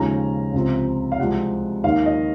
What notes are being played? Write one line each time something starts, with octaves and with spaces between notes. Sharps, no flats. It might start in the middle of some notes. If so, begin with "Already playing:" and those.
Already playing: D#2 C#3 F3 G#3 C#4 A#5
C#2 C3 F3 C4
F5
C2 C3 F3 G#3 F#5
D#2 D#3 A#3 F5
D#5